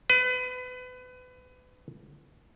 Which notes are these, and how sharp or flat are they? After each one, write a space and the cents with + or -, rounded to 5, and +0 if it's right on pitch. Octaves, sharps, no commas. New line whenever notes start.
B4 +30